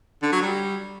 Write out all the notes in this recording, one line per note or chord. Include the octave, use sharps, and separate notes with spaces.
D3
F#3
G3